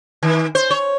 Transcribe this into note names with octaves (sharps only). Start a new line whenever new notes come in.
D#3
C5
C#5